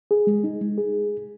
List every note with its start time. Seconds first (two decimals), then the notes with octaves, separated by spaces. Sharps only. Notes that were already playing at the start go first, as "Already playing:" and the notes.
0.11 G#4
0.27 G#3
0.44 D#4
0.61 G#3
0.78 G#4